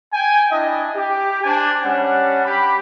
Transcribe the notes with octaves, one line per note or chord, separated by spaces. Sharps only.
G5 G#5
D4 E4 D#5
G4
D4 C5 G#5 A5
G3 C#4 D4 F#5
G4 B5